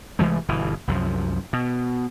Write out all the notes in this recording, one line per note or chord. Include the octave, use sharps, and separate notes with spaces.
C2 E3 G#3 A3
G1 B2 E3
C2 F#2 F3
B2